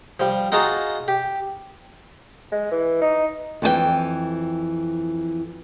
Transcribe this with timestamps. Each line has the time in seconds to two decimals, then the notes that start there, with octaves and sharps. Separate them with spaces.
0.20 F3 G3
0.52 D#4 F4 F#4 G#4 A5 A#5
1.08 G4
2.52 G#3
2.71 E3
3.01 D#4
3.62 F2 E3 A4 G5